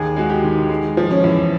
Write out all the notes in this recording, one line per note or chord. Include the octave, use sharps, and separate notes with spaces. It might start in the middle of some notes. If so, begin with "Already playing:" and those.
Already playing: D#2 G#4
G#3 F#4
G4
D#3
G#3
F3
C#4
E2